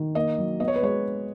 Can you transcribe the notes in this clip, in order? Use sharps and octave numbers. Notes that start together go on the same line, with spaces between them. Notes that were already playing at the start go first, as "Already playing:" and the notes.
Already playing: D#3
A#3 D#5
F#3
B3 D#5
C#5
B4
G#3 C#5